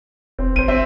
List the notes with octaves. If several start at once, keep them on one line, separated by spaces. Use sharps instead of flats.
F1 C4
G#1 C5 D#7
C4 E5